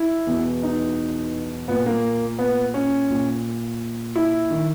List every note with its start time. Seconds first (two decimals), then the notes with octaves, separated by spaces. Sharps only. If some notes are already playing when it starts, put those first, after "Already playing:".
Already playing: E4
0.27 E2 B2
0.63 D#4
1.68 A#2 B3
1.86 A#3
2.39 B3
2.74 C#4
3.10 A#2
4.16 E4
4.51 D#3